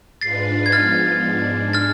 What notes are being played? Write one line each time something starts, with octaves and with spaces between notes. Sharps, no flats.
G#2 G#3 D4 F4 B4 A6 C7
G#6
F3 G#3 B3 F4 F6 A6
G#2 G#3 D4
F6 A6